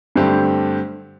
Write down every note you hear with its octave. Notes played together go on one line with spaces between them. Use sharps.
G2 D3 A3 C4 G4